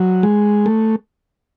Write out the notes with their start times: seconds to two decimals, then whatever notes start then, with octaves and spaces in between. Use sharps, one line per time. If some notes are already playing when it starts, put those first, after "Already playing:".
Already playing: F#3
0.23 G#3
0.66 A3